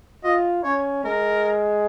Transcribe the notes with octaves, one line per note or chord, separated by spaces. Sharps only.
F4 D#5
C#4 C#5
G#3 A#4